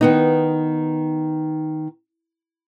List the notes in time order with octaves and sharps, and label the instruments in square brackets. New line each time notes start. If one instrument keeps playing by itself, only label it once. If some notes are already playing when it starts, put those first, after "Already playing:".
[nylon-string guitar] D#3 B3 D#4